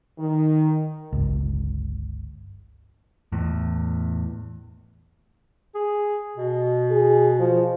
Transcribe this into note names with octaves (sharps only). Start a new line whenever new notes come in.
D#3
G1 C#2
E2 A2
G#4
B2
G#4
F3